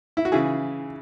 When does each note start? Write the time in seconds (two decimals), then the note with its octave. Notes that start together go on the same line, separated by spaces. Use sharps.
0.17 E4
0.25 F#4
0.32 C#3 E3 E4 G#4